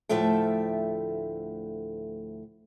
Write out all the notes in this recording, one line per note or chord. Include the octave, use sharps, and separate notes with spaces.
D2 A2 F3 A3 E5 G5